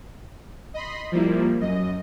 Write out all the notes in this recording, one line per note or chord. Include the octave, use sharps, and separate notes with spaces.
D#5 B5 C6
F3 G3 A#3 E4
F#2 D#5